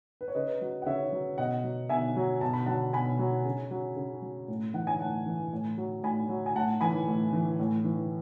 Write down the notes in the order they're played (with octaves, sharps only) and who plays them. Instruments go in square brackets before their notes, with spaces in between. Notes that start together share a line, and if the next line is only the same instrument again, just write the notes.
[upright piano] B4
C#5
C#3 B4 D#5
F#3
F#5
C#3 C#5 E5
F#3
B2 D#5 F#5
F#3
B2 E5 G#5
F#3
B2 A5
B5
F#3 F#5 A5
B2 G#5 B5
F#3
C#3
F#3
C#3
F#3
A2
E3 F#5
G#5
A2 F#5 A5
E3
A2
F#3
A2 G#5 B5
F#3
G#5
A2 F#5 A5
E3 G#5 B5
A2
E3
A2
E3